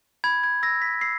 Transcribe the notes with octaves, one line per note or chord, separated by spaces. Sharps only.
B5 G#6
G#6
E6 A#6
B6
E6 C7